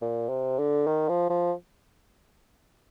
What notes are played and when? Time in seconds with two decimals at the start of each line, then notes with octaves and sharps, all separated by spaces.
0.01 A#2
0.29 C3
0.59 D3
0.87 D#3
1.09 F3
1.30 F3